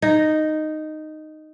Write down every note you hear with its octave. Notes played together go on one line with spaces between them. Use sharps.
D#4